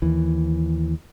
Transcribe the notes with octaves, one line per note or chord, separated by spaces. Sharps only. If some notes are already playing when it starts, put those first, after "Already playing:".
D#2 E3